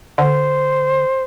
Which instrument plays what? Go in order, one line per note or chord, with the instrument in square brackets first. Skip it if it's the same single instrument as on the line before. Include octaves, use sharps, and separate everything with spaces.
[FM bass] D3 [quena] C5